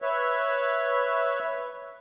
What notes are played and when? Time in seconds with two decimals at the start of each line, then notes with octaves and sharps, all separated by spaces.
0.02 B4 C#5 E5